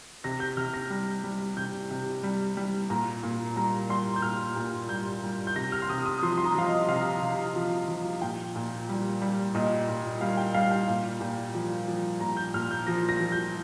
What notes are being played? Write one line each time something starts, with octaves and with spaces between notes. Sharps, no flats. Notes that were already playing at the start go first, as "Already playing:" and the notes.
C3 A#6
G6
C3 F6
A#6
G3
G3
C3 G6
C3
G3
G3
A#2 A#5
A#2
G3 A#5
G3 C6
G6
A#2 F6
A#2
G3 G6
G3
G6
C3 A#6
F6
C6
C3 D#6
D#6
F3 C6
C6
A#5
F3 F5
D#5
C3 F5
C3
F3
F3
A#2 G5
A#2
G3
G3
A#2 D#5
A#2
G3 F5
G5
G3 F5
G5
A#2
A#2
F3
F3
A#2 A#5
G6
A#2 F6
G6
F3 A#6
A#6
F3
G6